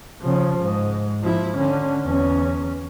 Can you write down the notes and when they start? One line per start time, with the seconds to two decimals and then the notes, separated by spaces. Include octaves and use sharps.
0.21 C#3 F3
0.60 G#2
1.22 F3 E4
1.57 D3 C#4
2.04 E2 C#4